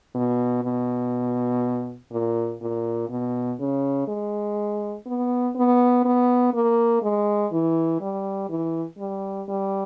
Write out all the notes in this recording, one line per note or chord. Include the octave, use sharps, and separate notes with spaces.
B2
B2
A#2
A#2
B2
C#3
G#3
B3
B3
B3
A#3
G#3
E3
G3
E3
G3
G3